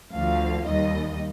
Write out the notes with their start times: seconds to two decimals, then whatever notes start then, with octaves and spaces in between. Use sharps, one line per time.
0.12 D2 D3 F3 F5
0.65 D#2 D#3 G3 D#5